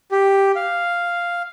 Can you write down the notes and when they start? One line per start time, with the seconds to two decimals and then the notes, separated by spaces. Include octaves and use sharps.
0.11 G4
0.56 F5